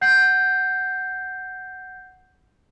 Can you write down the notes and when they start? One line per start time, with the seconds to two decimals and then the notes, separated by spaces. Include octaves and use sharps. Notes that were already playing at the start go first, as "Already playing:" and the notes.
0.01 F#5 G6 C7